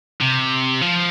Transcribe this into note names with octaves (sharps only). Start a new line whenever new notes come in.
C3
F3